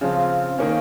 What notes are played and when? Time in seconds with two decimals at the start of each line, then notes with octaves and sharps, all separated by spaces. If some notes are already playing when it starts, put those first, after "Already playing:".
0.01 C#3 F3 C4 F4
0.59 D#3 A#3 C#4